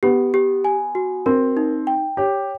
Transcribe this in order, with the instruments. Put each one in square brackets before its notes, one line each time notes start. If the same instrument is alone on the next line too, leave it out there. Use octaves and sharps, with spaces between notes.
[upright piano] B3 [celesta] G4
[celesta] G4
G#5
F#4
[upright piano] C4 [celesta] A#4
[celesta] D#4
G5
[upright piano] G4 [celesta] C#5